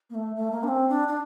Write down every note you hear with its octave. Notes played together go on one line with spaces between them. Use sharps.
A#3
A3
A3
A#3
D4
C4
D4
D4